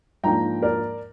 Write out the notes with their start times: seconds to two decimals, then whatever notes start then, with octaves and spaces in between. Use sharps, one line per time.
0.24 G#2 F3 A#3 D4 G5 A#5
0.63 A#4 D5